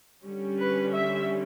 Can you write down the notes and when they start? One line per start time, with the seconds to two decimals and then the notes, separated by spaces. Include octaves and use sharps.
0.24 D3 G3 C#4
0.60 B4
0.94 E5